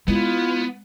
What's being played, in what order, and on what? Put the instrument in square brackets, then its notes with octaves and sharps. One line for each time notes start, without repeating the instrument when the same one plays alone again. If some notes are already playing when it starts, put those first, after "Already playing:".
[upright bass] G#3 [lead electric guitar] B3 [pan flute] E4 [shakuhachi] F4